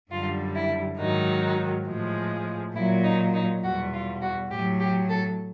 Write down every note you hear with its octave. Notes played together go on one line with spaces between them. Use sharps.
F#2 D3 G3 F4
E4
G#2 D#3 F#3 D#4
A2 F3 G#3
A#2 F#3 E4
D#4
D#4
E2 B2 G3 F#4
F4
F#4
A2 F#3 G4
G4
A4